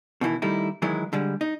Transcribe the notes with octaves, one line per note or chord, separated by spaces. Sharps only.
B2 D#3 E3 E4
D#3 G3 A3 D#4 E4
D#3 E3 F#3 G#3 E4
D3 G3 G#3
D#4